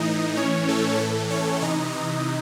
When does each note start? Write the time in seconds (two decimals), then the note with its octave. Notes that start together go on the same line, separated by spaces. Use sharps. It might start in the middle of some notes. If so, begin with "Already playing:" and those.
Already playing: A2 E3 D#4 D#5
0.37 A2 E3 C#4 C#5
0.68 A3 A4
0.99 A2 E3 A3 A4
1.30 C#4 C#5
1.61 C3 E3 D#4 D#5
1.92 D#4 D#5